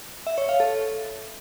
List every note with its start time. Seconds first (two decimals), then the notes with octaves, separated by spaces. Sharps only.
0.27 E5
0.38 C#5
0.49 F5
0.60 A4